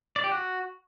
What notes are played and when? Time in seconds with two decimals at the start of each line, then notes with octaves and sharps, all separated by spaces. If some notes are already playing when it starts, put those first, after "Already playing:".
0.16 D5
0.24 G4
0.32 F#4